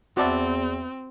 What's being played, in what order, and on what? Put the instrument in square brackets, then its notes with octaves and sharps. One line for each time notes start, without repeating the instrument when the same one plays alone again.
[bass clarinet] E2 [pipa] B3 D5 E5 [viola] C4 [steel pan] F#4 A5